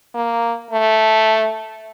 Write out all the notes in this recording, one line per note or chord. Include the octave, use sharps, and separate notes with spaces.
A#3
A3